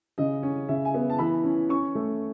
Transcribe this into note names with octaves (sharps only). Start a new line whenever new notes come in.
C#3 D#5
C#4
C#3 E5
G#5
B3
A5
E3 B5
C#4
C#4 C#6
A3